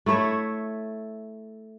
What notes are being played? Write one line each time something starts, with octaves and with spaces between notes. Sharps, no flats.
A3 E4 C#5 E5